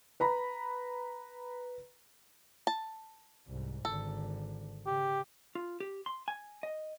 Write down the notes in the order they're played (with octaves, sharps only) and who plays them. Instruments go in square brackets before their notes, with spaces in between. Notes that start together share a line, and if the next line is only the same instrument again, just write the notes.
[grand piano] B4 A#5 B5
[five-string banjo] A5
[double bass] C2 G#2
[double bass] G#1 D3 [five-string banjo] A4
[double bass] C#3 [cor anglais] G4
[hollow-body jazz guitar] F4
G4
C6
G#5
D#5